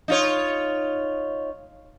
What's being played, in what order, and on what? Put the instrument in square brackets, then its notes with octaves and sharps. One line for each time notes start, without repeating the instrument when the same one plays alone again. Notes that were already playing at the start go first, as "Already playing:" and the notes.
[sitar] D#4 F4 C#5